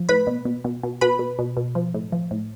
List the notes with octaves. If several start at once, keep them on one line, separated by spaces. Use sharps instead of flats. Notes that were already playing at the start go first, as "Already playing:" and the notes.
Already playing: F3
A2 B4 B5
B2
B2
B2
B2
B2 B4 B5
B2
B2
B2
F3
A2
F3
A2